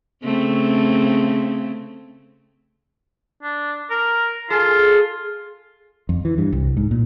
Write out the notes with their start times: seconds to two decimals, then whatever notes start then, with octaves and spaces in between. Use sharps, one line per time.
0.24 C#3 A3 C4
3.43 D4
3.91 A#4
4.50 F4 G#4 A4
6.09 F2
6.25 E3
6.38 G2
6.52 C2
6.77 G#2
6.91 A#2